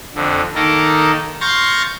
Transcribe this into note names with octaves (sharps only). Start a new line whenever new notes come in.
F2 D3
D#3 A#3 D#4 A4 A#4
F5 C6 C#6 G6 A6 A#6